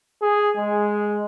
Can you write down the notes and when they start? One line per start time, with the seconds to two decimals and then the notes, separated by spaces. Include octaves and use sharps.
0.22 G#4
0.57 G#3